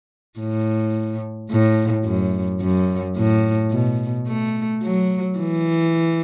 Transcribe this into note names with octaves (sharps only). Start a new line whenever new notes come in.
A2
A2
F#2
F#2
A2
B2
A3
F#3
E3